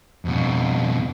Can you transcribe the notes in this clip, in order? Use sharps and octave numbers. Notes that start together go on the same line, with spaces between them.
F2 B2